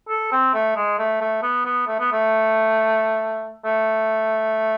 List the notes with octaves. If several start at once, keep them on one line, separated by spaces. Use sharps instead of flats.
A4
C4
A3
G#3
A3
A3
B3
B3
A3
B3
A3
A3